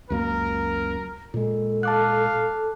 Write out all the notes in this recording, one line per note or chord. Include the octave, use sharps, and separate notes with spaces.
C#2 F#2 A#3 A#4
A#2 G#3 A4
F5 A5 D6 F#6